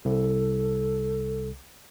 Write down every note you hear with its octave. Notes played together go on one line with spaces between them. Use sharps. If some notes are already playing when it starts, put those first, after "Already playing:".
C2 A4